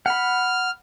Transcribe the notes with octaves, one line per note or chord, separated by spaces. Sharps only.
F#5 B5 F6